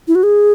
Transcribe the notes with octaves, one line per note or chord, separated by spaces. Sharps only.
E4
F#4
G#4